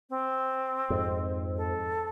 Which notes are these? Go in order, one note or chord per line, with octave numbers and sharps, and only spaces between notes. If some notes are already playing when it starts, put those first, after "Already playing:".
C4
F2 G#2
A4